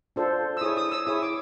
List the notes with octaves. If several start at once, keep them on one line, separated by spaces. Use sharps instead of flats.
D4 F4 A4 C5
E6
E4 G#4 C#5 D#6
D#6
E6
E4 G#4 C#5 D#6
D6